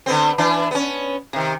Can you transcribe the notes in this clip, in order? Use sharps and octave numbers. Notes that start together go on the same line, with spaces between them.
D3 B3 C4
E3 D4
B3 C#4
C3 D#3